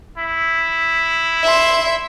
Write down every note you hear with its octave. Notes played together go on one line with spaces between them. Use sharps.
E4
E5 C6